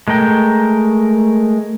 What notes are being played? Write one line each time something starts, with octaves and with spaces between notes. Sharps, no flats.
G#3 A3 A#4 G5